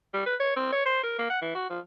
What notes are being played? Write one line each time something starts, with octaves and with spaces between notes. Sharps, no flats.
G3
B4
C#5
C4
C#5
C5
A#4
A#3
F#5
E3
F#4
F3